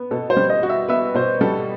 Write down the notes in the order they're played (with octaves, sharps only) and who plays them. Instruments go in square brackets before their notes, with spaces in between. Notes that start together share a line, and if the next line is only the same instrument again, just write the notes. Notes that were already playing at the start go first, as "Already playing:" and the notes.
Already playing: [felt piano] B3
[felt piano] B2 [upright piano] A4
[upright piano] C5
[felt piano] G3
[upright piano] D#5
[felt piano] F#4
[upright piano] E5
[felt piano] B3 [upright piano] E5
[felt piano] B2 [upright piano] C5
[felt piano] G3 [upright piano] A4